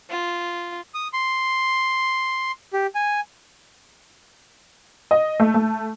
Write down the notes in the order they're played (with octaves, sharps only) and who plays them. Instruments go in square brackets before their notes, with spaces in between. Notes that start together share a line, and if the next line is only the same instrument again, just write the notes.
[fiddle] F4
[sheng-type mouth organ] D#6
C6
G4
G#5
[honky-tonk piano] D#5
A3
A3